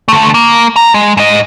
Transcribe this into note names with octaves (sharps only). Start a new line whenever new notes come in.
D3 A3
A#3
A#5
G#3
G#2 D#5